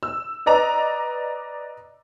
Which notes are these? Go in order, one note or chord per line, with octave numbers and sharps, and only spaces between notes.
E6
B4 D5 D#5 A#5 F7